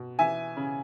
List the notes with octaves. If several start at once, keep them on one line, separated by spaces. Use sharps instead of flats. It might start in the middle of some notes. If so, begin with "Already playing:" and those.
Already playing: B2
E3 E5 G#5
C#3